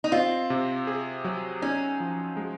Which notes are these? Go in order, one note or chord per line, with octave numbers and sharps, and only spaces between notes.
D#4
C4 F4
C3
G#4
F#3
C#4 D#4
F3
G#3